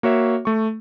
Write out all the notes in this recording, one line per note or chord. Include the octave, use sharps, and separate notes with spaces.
A#3 F#4 C#5 E5
A3 C#6